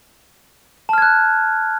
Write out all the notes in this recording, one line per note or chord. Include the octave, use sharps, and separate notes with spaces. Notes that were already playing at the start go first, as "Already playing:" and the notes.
A5 F6 F#6 G#6